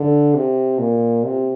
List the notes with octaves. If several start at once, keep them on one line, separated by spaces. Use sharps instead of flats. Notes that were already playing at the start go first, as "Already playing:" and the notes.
Already playing: D3
C3
A#2
C3